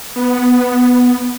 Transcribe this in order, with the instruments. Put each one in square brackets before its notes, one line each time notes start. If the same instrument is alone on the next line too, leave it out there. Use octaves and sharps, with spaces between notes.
[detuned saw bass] B3